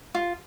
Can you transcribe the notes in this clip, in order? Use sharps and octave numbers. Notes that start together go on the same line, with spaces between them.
F4